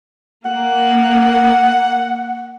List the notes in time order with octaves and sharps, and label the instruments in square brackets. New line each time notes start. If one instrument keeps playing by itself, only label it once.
[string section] A#3 [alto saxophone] F#5